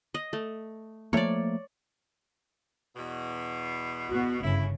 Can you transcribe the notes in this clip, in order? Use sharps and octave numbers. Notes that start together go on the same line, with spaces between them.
D#5
A3
F3 A3 A#3 C#5 D5
E2 B2
B3 F#4
G1 C#3 E4